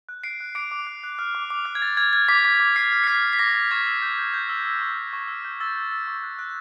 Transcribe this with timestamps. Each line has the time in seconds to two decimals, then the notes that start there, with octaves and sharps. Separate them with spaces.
0.09 F#6
0.24 F#6 C7 D7
0.40 F#6
0.55 D6 C7 D7
0.71 D6
0.87 F#6
1.04 F#6
1.19 F6
1.35 D6
1.50 D6
1.65 F6
1.75 G#6
1.82 F6 A6
1.97 F6 G#6
2.13 F6 G#6
2.28 D6 B6
2.44 D6 B6
2.60 D6
2.76 F6 C7
2.92 F6
3.04 C7
3.07 F6 B6
3.23 F6
3.33 B6
3.39 D6 A#6
3.55 D6
3.71 C#6 G#6
3.87 E6
4.02 G6
4.18 G6
4.34 G6
4.49 E6
4.65 E6
4.81 C#6
4.97 G6
5.13 C#6
5.28 E6
5.45 G6
5.61 E6 A6
5.76 G6
5.91 E6
6.07 C#6
6.23 F#6
6.39 F#6